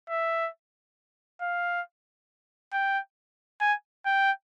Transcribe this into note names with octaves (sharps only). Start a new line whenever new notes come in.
E5
F5
G5
G#5
G5